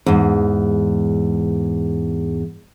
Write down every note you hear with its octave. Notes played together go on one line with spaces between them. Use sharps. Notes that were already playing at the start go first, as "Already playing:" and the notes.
E2 G#2